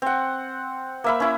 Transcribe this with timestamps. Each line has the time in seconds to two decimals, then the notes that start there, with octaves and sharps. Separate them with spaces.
0.02 C4 F#5
1.04 A#3 E5 B5
1.20 C#4 E4